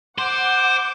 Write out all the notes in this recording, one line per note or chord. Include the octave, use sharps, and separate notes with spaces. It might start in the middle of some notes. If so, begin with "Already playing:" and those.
C5 F#5 D6